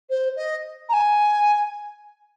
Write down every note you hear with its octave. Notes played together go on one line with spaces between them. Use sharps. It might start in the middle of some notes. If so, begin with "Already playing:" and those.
C5
D#5
A#5
G#5